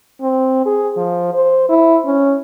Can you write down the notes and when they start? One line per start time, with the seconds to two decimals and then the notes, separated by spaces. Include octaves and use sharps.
0.21 C4
0.66 G#4
0.97 F3
1.34 C5
1.70 E4
2.06 C#4